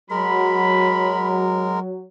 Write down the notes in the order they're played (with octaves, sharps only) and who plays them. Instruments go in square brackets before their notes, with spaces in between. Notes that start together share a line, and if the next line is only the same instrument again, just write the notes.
[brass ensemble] F#3 [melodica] G#3 A#4 [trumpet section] B5